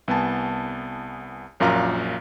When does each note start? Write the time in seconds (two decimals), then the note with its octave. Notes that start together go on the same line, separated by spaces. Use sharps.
0.08 C2 B3 G#5 A5
1.60 A#1 F#2 A#2 F5 A#5 F6